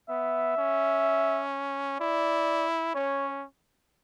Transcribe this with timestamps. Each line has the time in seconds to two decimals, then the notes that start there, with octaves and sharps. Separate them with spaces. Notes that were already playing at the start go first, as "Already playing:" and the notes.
0.09 B3 E5
0.57 C#4
2.00 E4 D5
2.95 C#4 C#5